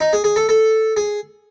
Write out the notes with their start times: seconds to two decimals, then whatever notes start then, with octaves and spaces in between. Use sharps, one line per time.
0.01 D#4
0.13 G#4
0.24 G#4
0.36 A4
0.49 A4
0.97 G#4